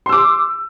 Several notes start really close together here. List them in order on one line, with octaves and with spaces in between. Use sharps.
C6 E6 D6